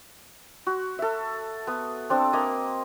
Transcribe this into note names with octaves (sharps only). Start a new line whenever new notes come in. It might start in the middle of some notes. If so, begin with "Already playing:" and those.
F#4
A4 E5
B3
C4 D4 A4
A#3 D#5